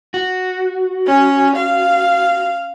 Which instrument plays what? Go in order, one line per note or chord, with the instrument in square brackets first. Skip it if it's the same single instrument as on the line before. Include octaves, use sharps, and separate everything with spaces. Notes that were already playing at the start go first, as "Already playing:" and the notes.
[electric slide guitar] F#4
[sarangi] C#4
F5